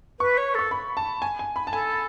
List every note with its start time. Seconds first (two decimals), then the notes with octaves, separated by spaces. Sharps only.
0.20 B4 C#6
0.37 C#5
0.54 A4 C#6
0.71 B5
0.97 A5
1.22 G#5
1.39 G#5
1.56 B5
1.67 A5
1.73 A4 G#5